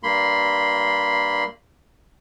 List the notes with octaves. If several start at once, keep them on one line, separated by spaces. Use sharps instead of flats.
G2 A#3 B5 C6